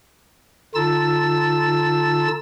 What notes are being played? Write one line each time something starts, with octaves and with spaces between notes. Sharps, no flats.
D3 D#4 F4 A5 E6 A6